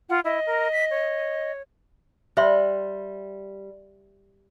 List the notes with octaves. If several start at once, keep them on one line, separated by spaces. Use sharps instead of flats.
F4 F#5
E4 D#5
A#4
B6
C#5
G3 C5 E5 C6